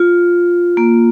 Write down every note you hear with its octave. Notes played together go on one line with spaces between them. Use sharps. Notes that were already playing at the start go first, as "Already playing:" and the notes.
Already playing: F4
A#3